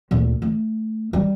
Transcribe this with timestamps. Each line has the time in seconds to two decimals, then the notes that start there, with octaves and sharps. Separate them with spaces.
0.11 D2 A#2
0.42 A3
1.13 G3